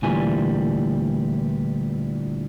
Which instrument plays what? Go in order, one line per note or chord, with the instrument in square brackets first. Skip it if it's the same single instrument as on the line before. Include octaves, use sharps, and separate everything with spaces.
[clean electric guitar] D2 A#2 E3 G3 G#5